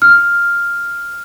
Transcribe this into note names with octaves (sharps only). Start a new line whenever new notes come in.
F6